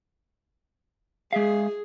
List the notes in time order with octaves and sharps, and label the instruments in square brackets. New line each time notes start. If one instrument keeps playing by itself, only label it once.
[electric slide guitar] G#3 E5 F5 [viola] G#4